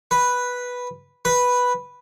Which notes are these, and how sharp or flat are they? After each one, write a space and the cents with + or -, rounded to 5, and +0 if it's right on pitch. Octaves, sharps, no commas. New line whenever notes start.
B4 -5
B4 -5